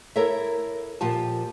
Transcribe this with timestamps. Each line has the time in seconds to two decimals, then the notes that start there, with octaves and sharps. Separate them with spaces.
0.16 E4 A4 A#4 C#5 E5
1.01 A#2 F3 F4 G4 A5